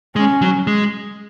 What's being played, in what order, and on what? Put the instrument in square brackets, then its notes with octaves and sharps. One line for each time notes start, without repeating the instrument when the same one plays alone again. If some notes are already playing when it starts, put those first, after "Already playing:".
[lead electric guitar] G#3 [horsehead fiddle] C#4
[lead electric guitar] F#3
G#3